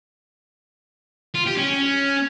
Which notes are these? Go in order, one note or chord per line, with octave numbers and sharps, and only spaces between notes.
F4
G4
C#4